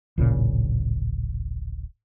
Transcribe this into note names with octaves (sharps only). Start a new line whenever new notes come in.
D1 A1 A#2 C#3